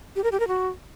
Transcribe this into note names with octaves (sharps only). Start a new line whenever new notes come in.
G4
A#4
G4
A#4
F#4